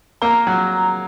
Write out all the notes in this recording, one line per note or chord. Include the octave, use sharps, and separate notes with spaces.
A#3 A#5
F#3